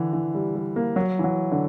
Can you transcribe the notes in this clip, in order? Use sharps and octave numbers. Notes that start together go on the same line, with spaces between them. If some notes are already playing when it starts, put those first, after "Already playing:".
Already playing: D3 E3
E3
G3
G3
A#3
F#3
E3
F#3
D3